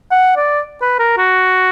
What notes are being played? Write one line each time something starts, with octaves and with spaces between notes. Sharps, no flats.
F#5
D5
B4
A#4
F#4